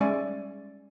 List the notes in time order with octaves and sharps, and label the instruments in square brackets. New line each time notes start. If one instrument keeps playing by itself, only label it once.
[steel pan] G3 G#3 C#4 D5 E5 G#5